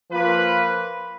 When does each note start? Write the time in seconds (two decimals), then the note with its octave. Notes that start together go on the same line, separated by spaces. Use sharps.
0.11 F3 A#3 F4 B4